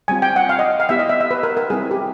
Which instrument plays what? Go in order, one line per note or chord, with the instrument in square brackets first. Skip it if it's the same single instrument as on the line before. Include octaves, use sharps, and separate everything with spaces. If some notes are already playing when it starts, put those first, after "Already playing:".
[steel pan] G3 C4 F4 G#5
G5
F#5
F5
D#5
F5
B3 E4 G4 E5
D#5
E5
E5
B4
A#4
A#4
G3 C4 E4 G#4
G4